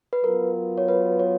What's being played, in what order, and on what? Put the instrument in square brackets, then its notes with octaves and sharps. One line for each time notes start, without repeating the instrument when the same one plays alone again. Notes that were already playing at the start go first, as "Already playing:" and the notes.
[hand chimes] B4
[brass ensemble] F#3 B3 F4 [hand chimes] A#4
[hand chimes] C#5
B4
C#5